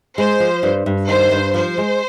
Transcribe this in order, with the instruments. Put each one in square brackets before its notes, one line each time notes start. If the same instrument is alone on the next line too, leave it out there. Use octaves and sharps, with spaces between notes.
[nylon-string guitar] G#3 [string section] C5
[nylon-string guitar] F3
G2
G2
[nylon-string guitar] D#3 [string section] C5
[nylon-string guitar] G2
[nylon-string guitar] F3 [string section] C5
[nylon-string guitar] G#3